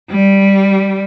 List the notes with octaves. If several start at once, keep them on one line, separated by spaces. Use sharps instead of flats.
G3